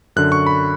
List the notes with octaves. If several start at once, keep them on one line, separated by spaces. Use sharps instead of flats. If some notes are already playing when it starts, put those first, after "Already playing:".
F#2 D3 F#6
C#6
B5